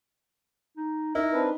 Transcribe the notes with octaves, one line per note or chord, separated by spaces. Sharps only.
D#4
D#4 E4 A#4
C4 D4 B4